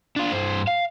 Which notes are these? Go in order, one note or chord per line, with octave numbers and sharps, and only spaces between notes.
D4 F4
G2 C5
F5